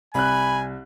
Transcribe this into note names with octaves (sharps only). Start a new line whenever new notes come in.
C2 G#5 B5 F#6